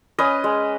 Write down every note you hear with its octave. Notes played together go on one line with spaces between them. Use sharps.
C#4 B4 D#5
G#3